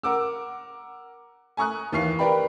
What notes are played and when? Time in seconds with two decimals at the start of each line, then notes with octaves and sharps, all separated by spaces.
0.03 A#4 F#5 D6 E6
1.57 G#5 A#5 C#6 D#6 F#6
1.92 D#2 E3 F5 C#6 C7
2.19 G4 A#4 B4 D5 G5 B5